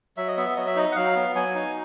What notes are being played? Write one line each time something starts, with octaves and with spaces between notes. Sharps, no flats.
F#3 E5
D#5
B3 E5
F#3 D#5
E5
D#4 D#5
F#5
F#3 F5
B3
F#3 G#5
D#4